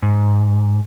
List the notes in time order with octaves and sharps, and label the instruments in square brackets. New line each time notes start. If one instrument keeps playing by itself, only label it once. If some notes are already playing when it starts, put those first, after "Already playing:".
[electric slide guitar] G#2